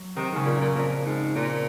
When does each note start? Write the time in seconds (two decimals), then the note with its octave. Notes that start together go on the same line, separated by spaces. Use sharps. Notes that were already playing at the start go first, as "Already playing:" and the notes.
Already playing: F#3
0.16 C3 D#3
0.31 G#2
0.36 C#3
0.46 A#2
0.56 F#2
0.61 A#2
0.75 F2 A#2
1.05 G#2
1.35 A#2